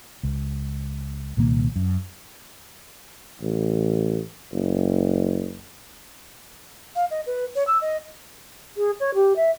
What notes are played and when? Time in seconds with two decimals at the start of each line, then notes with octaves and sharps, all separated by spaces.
0.23 C#2
1.37 C2 A#2 D#3 A#3
1.76 F#2
3.42 A1
4.52 F#1
6.96 F5
7.11 D#5
7.27 B4
7.56 C#5
7.67 E6
7.81 D#5
8.77 G#4
9.00 C#5
9.15 G4
9.36 E5